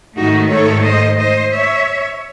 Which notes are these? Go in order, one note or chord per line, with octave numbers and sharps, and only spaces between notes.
G#2 D#3 A3 D#4 F#4
A4 C#5
C5 D#5
C5 D#5
C#5 E5